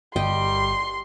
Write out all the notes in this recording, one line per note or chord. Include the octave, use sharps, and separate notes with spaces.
G1 G3 G4 D#5 G5 C6